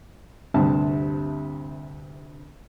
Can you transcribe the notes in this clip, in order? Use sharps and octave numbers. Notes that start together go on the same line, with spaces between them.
D2 G2 C3 A5